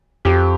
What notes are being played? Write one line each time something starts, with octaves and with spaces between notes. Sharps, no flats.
F2 G4